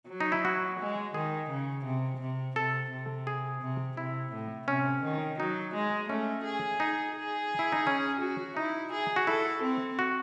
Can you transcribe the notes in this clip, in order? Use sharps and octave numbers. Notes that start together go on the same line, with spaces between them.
F#3
D#4
E4
F#4
G#3
D#3 G#4
C#3
C3
C3
C3 A4
C3
G#4
C3
C3 E4
A2
C3 C#4
D#3
F#3 D#4
G#3
A3 C#4
G#4
D#4
G#4
E4
D#4
C#4
F#4
D#4 E4
G#4
F#4
E4 A4
C4
F#4